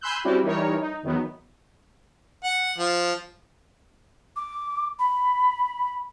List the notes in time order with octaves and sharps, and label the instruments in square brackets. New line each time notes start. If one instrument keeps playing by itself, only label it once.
[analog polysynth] G#5 B5 C6 E6 F#6 G6
G3 C4 C#4 E4 F#4 G4
E3 G3 D#4 A#4 C#5
D#4
E2 D#3 F#3 B3
[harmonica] F#5
F3
[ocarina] D6
B5